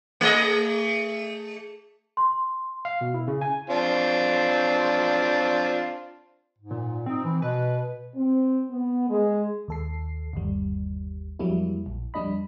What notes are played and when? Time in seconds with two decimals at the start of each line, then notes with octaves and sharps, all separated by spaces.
0.21 A3 G#4 D#5
2.17 C6
2.85 F5
3.01 B2
3.14 E4
3.28 C#3
3.41 G#5
3.70 C4 D4 F4
6.58 G#2
6.71 A#2
7.06 C4 D#4
7.24 E3
7.42 B2 B4
8.16 C4
8.70 B3
9.09 G#3
9.68 D#2 A4 C7
10.33 G1 D#2 G3
11.39 F2 F#3 G3 A#3 E4
11.86 A#1
12.14 F2 G3 D4 D#5 B5